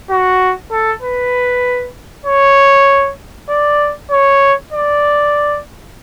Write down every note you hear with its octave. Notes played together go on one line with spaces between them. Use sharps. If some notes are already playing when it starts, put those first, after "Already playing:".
F#4
A4
B4
C#5
D5
C#5
D5